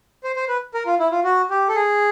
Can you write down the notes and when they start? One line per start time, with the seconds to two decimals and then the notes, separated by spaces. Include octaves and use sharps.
0.24 C5
0.36 C5
0.48 B4
0.74 A#4
0.86 F4
1.00 E4
1.11 F4
1.24 F#4
1.50 G4
1.69 A4
1.75 G#4